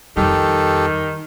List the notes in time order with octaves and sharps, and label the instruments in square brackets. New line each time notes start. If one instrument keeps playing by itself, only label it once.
[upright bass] F2 G3 [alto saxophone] D#3 [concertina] G4 A4